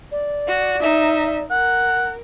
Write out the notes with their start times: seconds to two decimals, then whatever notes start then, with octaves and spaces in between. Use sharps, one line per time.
0.12 D5
0.48 F#4
0.81 D#4 E5
1.51 A#4 F#5